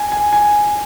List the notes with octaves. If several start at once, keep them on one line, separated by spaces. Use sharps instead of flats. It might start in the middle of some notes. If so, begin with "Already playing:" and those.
Already playing: G#5
G#5
G#5